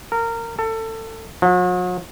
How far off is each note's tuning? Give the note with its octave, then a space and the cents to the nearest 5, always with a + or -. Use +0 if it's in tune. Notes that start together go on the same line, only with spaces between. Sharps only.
A#4 -20
A4 +25
F#3 -45